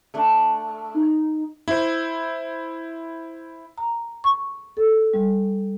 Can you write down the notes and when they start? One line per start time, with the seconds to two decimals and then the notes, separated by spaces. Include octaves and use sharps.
0.14 A3 D4
0.95 D#4
1.68 E4 C5
3.78 A#5
4.24 C#6
4.77 A4
5.14 G3